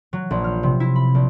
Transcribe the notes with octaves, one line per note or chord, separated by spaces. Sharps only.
F#3
A#1
F6
C3
E4
B5
A#1